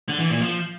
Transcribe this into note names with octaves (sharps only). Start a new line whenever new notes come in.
D3
E3
A#2
F3